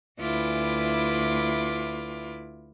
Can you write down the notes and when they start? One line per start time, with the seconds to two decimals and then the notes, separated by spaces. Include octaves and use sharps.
0.20 D2 E4 F4 B4 D6